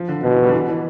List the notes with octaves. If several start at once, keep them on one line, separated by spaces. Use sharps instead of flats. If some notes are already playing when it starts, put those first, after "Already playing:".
Already playing: F3
D3
B2 D3
E3
G3
D3
E3
E3